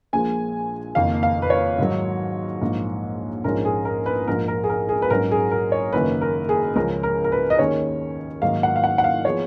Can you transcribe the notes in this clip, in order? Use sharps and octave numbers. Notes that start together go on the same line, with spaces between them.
A#1 A#2 F3 G#3 G#5
F#1 F2 D#3 A#3 F5
F5
B4
C#5
G#2 D#3 F#3
A#1 G#2 F3 A#3
A#1 G#2 F3 G#3 C#4 A#4
G#4
A#4
B4
A#1 G#2 F3 A#4
A#4
G#4
A#4
G#4
B4
A#1 G#2 F#3 C#4 A#4
G#4
A#4
C#5
F#1 F#2 D#3 A#3 C#4 B4
A#4
G#4
C#2 C#3 F3 G#3 C#4 A#4
A#4
A#4
B4
D#5
D#2 D#3 G#3 C#4 C#5
G#2 D#3 F#3 A#3 F5
F#5
F5
F#5
F#5
F5
F3 G#3 B3 C#5